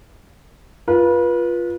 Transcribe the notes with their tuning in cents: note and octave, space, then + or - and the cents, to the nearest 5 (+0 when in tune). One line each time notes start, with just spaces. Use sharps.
F4 +0 B4 -30